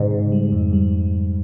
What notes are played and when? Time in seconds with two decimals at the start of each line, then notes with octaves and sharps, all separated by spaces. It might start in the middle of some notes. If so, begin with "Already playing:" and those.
Already playing: G#2 C#3
0.11 C#3
0.32 G3
0.52 F2
0.73 G3